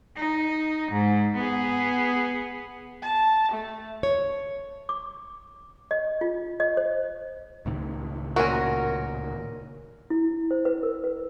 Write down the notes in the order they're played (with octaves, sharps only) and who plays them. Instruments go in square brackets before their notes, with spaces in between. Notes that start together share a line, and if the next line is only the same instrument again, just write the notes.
[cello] D#4
G#2
B3 G#4
[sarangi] A5
A3
[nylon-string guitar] C#5
[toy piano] D6
D#5
F4
D#5
C5
[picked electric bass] C#2 A2 D#3
[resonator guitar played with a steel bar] A#2 A#4 [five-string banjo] C#4 F#4
[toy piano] E4
C5
B4
A#4
B4